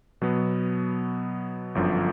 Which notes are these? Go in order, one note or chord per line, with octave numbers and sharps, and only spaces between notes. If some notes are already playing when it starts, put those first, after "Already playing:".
B2 F#3 B3
G1 F#2 D3 F3